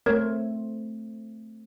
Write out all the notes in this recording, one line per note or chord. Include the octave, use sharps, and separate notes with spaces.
A3 C4 A#4 C#5 G#6